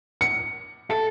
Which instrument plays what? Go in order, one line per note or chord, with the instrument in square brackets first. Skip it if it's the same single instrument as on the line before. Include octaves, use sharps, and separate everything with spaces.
[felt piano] C#7
[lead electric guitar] A4